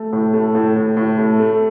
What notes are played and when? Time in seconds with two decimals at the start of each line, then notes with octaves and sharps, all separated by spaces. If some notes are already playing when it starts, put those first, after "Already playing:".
Already playing: A3
0.13 A2
0.34 A3
0.55 A2
0.76 A2
0.97 A2
1.18 A3
1.39 A3